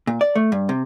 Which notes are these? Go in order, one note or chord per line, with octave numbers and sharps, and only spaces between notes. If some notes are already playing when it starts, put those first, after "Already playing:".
A#2
D5
A3
G2
C3